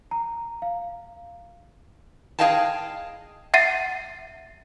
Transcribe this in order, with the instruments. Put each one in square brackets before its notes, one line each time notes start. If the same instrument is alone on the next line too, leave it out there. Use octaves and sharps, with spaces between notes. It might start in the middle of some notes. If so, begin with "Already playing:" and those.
[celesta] A#5
F5
[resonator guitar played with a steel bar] G#4 C5 D#5 F5 G5 A5
[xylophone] E5 F#5 A6 C7 D#7